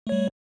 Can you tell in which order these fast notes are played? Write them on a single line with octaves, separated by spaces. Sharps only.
A3 C#5 G3